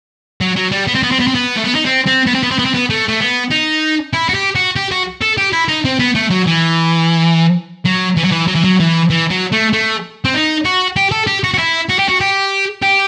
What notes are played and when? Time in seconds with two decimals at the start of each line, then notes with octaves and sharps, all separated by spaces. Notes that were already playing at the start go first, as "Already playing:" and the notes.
0.41 F#3
0.56 F#3
0.72 G3
0.87 B3
0.95 C4
1.03 B3
1.11 C4
1.20 B3
1.28 C4
1.35 B3
1.57 A3
1.65 B3
1.75 D#4
1.86 C4
2.07 C4
2.26 B3
2.34 C4
2.43 B3
2.51 C4
2.59 B3
2.66 C4
2.74 B3
2.90 A3
3.08 A3
3.21 B3
3.51 D#4
4.13 E4
4.29 F#4
4.35 G4
4.55 F#4
4.76 G4
4.91 F#4
5.22 A4
5.38 G4
5.53 E4
5.68 D#4
5.85 C4
5.99 B3
6.15 A3
6.30 F#3
6.47 E3
7.85 F#3
8.17 E3
8.24 F#3
8.31 E3
8.47 F#3
8.55 E3
8.64 F#3
8.80 E3
9.10 E3
9.30 F#3
9.52 A3
9.73 A3
10.25 C4
10.34 D#4
10.65 F#4
10.96 G4
11.11 A4
11.27 G4
11.44 F#4
11.54 F#4
11.58 E4
11.89 F#4
11.99 G4
12.08 F#4
12.20 G4
12.82 G4